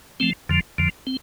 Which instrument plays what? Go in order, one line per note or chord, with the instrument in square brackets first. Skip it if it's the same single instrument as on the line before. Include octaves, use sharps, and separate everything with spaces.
[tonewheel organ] F3 A3 C4
F2 D3 F3
F2 D3 F3
C4